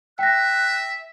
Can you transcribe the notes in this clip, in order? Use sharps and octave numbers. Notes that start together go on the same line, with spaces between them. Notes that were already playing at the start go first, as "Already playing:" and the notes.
E5 G5 F#6 A#6